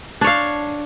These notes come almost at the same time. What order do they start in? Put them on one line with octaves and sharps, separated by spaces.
D4 C#5 F5